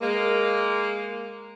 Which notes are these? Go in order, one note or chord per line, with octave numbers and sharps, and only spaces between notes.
G#3 A#3